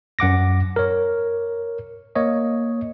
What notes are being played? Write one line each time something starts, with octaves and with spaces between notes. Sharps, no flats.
F#2 F#5 D6 A#6
A#4 C#5
A#3 C#5 D#5